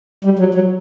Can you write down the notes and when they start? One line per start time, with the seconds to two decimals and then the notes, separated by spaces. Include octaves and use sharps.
0.25 G3
0.39 F#3
0.55 F#3